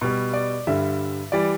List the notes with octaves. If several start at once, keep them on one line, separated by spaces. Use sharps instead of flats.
B2 G3
D5
G2 D3 G3 E5
E3 G3 D5